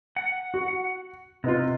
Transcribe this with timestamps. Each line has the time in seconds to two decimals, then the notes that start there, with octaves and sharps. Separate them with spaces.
0.16 F#5
0.54 F#4
1.44 C3 B3 D#4 F4